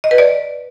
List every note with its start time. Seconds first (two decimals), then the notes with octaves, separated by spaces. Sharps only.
0.04 D#5
0.11 B4
0.18 D5